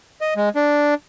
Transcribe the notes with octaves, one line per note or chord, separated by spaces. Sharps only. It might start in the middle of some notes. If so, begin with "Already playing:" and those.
D#5
G#3
D4